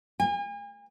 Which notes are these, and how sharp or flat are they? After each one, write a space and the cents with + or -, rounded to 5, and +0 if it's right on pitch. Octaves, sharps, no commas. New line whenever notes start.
G#5 -40